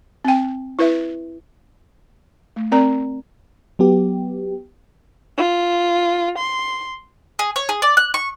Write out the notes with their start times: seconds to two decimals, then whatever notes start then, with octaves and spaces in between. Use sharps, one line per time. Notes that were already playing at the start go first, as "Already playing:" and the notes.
0.25 C4 G5
0.79 E4 B4 E5
2.56 A3
2.72 C4 A#4 D5 A#5
3.79 F#3 B3 G4
5.37 F4
6.38 C6
7.39 G#4
7.56 C#5
7.69 G#4
7.82 D5
7.97 F#6
8.14 C#6